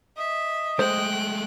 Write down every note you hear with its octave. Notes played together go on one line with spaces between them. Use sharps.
D#5 E5
G#3 A3 C5 G5 F#6